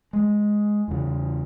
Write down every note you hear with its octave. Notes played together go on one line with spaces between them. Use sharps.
G#3
E2 C#3